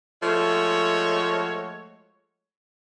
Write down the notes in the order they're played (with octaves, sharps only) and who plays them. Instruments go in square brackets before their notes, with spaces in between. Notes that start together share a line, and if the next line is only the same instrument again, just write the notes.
[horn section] F3 G#3 A3 F#4 C#5